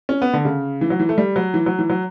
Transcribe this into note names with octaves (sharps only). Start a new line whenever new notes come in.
C#4
B3
D3
C#3
E3
F#3
E3
A3
G3
F#3
E3
F#3
E3
F#3